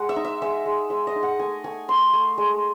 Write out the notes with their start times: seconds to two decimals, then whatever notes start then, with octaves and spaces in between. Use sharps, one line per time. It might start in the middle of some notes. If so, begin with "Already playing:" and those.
Already playing: G#3 F#5
0.09 E5
0.16 D#4
0.25 E5
0.42 G#3 E5
0.66 G#3
0.90 G#3 E5
1.07 D#5
1.15 D#4
1.23 F#5
1.39 A3 G#5
1.64 A3 G#5
1.88 A3 C6
2.13 A3
2.38 G#3